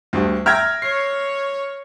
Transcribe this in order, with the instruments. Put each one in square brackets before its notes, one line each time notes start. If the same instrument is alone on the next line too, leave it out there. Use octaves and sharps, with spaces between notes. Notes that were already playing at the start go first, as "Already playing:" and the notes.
[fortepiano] D2 G2
[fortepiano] E5 G5 A#5 [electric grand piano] F6 G#6 A#6
[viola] C#5 [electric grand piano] C7